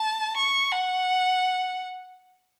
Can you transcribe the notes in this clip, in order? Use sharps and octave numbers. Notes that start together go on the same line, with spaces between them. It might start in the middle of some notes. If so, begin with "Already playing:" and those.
Already playing: A5
C#6
F#5